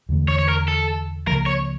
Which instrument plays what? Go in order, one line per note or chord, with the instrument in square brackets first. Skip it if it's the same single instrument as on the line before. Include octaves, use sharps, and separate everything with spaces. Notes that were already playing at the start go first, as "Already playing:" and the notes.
[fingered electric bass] E2 D3 A3
[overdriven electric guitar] C#5
C#5
A#4
A4
[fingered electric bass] C#2 C#3 F3 A#3 [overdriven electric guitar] A#4
[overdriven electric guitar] C#5